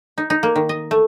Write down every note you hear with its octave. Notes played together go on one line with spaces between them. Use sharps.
D#4
D#4
A#3
D#3
D#5
A3